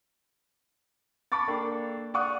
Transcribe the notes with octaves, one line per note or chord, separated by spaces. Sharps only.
A5 B5 C#6 D6 A6
A#3 D4 A4 G5
D5 F5 F#5 C#6 D#6 F#6